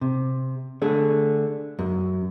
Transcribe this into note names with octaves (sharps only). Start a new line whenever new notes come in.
C3
D3 A3 G#4
F#2